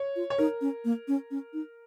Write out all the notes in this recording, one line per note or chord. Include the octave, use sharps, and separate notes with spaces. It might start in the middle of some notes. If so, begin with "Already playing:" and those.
Already playing: C#5
F4
C#5
D#4 A#4
C#4
A#3
C#4
C#4
D#4